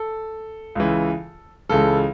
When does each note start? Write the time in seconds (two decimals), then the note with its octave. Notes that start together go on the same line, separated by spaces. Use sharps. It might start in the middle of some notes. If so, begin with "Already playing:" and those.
Already playing: A4
0.75 C#2 C#3 E3
1.69 C#2 C#3 E3 A4